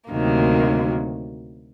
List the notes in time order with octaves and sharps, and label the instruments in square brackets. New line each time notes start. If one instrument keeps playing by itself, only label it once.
[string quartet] D2 C3 D#3 F#3 A#3